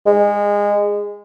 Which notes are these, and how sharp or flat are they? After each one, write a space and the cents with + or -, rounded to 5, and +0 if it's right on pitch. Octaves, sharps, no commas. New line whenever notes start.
G#3 -20